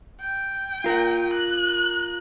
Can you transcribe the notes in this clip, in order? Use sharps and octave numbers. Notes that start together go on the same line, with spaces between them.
G5
F4 A#4
F#6